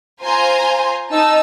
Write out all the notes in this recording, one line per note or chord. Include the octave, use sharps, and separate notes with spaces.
F4 C5 G#5 A#5 C6
D#4 A5 E6